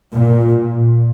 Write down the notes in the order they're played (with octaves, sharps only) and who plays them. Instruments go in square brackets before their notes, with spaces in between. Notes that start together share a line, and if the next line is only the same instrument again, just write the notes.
[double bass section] A#2